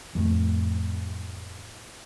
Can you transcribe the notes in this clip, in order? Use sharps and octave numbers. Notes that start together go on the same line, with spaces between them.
F2 A2